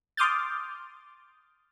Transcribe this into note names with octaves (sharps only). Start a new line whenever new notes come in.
C6 D6 D#6 F6 G6 A6